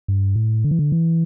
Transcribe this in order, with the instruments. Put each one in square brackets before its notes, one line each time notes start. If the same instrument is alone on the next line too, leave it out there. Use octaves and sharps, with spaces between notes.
[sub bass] G2
A2
D3
E3
D3
E3